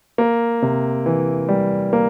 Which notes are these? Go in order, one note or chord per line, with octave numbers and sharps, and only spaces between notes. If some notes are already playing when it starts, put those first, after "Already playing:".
A#3
C3
E3
G3
A#3